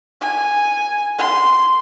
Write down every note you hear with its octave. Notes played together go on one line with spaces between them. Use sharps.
G#5
C6